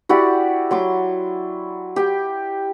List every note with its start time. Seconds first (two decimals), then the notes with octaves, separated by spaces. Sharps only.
0.09 E4 F#4 G4 D5
0.71 F#3 C6 D6
1.96 G4 G5